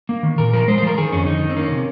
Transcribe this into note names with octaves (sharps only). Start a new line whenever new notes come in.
A#3
D#3
A#2 A#4
F3 A#4
G#3 C5
C5
F3 A#4
D#3 G#4
F2 C#4
D#3 D#4
D#3
C4
A#3 C#4
C3